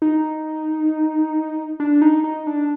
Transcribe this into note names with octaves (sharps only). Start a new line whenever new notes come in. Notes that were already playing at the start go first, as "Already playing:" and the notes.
D#4
D4
D#4
D#4
D4